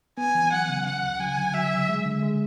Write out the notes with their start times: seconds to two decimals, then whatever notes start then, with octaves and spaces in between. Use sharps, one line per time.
0.18 B3 G#5
0.35 E3
0.53 F#3 F#5
0.69 C#3
0.85 C#3 F#5
1.03 D2
1.20 F#3 G#5
1.37 D3
1.54 F#3 E5
1.71 C#3
1.89 G#3
2.05 D3
2.23 G#3